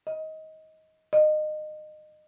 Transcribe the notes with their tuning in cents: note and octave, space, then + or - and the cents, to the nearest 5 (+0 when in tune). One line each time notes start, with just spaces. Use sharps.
D#5 +20
D#5 -25